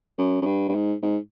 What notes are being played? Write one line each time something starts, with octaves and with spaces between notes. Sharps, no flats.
F#2
F#2
G2
G2
G#2
G#2